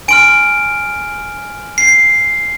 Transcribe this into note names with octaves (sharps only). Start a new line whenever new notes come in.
G#5 C6 F6 D7
C7